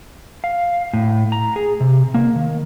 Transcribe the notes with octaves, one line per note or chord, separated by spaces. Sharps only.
F5
A2
A#5
G#4
C3
A#3
D#3